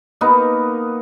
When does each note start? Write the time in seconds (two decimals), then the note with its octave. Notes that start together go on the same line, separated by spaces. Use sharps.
0.21 A#3 B3 D#4 A#4